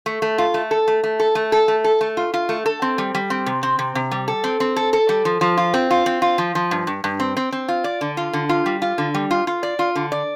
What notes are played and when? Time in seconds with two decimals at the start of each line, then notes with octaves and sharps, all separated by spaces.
0.06 A3
0.22 A3
0.38 F4
0.54 A3
0.71 A4
0.88 A3
1.04 A3
1.20 A4
1.35 A3
1.52 A4
1.68 A3
1.84 A4
2.01 A3
2.17 F4
2.34 F4
2.49 A3
2.66 A4
2.82 C4
2.98 G3
3.15 G3
3.30 C4
3.46 C3
3.63 C4
3.79 C3
3.95 C3
4.11 G3
4.28 A4
4.44 C4
4.60 C4
4.76 A4
4.93 A4
5.09 G3
5.25 F3
5.41 F3
5.57 F4
5.74 C4
5.91 F4
6.06 C4
6.22 F4
6.38 F3
6.55 F3
6.71 G2
6.87 G2
7.04 G2
7.20 C4
7.37 C4
7.52 C4
7.68 F4
7.84 D5
8.01 D3
8.17 F4
8.33 D3
8.49 F4
8.66 G3
8.82 F4
8.98 D3
9.14 G3
9.31 F4
9.47 F4
9.63 D5
9.79 F4
9.95 D3
10.12 D5